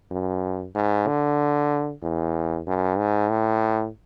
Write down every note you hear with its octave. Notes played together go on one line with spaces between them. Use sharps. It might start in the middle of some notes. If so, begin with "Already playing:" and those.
F#2
G#2
D3
E2
F#2
G#2
A2